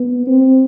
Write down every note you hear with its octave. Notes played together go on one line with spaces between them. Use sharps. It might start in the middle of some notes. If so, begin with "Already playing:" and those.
Already playing: B3
C4